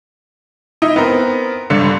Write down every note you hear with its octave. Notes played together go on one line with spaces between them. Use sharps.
D#4 E4
B3 C4 A#4
G1 G2 D3 C#7